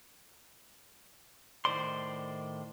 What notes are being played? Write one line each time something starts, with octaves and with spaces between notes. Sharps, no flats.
A2 D#3 A3 C5 D5 C6